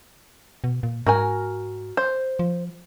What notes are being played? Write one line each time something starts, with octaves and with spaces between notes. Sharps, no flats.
B2
A#2
G#2 F#4 A#4 G#5
C5
F3